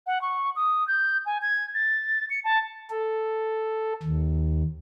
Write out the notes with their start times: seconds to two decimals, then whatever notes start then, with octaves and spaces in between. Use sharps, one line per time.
0.07 F#5
0.22 C#6
0.56 D#6
0.88 G6
1.26 G#5
1.42 G#6
1.75 A6
2.30 C#7
2.44 A5
2.90 A4
4.03 D#2